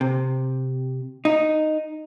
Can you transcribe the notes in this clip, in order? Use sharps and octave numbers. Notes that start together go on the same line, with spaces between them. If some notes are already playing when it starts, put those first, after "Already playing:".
C3
D#4